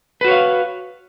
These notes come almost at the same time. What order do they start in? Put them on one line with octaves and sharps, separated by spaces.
B4 F#4 C#5 F5